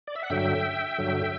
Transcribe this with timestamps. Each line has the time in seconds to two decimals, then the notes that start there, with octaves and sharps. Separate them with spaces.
0.07 D5
0.16 E5
0.23 F#5
0.30 G2 D3 F#3 E5 G5
0.98 G2 D3 F#3